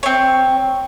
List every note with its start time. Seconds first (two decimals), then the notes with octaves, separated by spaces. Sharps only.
0.03 C4 C#5